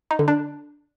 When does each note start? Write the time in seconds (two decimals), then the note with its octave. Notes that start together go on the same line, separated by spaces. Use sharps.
0.11 D#4
0.19 D3
0.28 D4